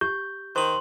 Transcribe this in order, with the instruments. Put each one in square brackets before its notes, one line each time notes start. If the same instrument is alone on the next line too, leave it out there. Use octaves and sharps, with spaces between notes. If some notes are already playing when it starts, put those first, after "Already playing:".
[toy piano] G4 [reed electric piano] G6
[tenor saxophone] D#3 [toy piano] C5 [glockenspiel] C6 F#7